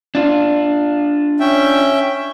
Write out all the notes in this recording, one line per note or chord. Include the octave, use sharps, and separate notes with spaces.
D4 F4
C#4 E5 G5